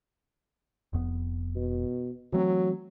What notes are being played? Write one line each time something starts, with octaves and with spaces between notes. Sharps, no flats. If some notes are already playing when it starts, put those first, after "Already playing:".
F1 F2 B3
B2
E3 F#3 A3 C4